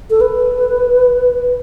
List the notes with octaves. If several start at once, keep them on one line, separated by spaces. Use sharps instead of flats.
A4
B4